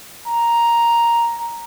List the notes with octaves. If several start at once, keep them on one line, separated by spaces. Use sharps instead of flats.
A#5